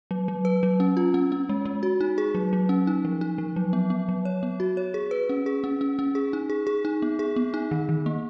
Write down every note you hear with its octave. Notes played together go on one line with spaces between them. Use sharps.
F#3
F#3
B4
F#3
C#4
F4
C#4
C#4
G#3
G#3
F#4
D#4
G#4
F#3
F#3
C#4
D#4
F3
D#4
F3
F#3
B3
B3
F#3
C#5
B3
F#4
C#5
G#4
B4
C#4
G#4
C#4
C#4
C#4
G#4
D#4
G#4
G#4
D#4
B3
G#4
B3
D#4
D#3
D#3
A#3